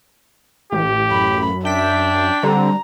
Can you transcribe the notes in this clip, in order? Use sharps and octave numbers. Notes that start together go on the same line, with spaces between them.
A1 G4
F#2 B5
D4 E5 G5 B6
D3 G3 C4 A#5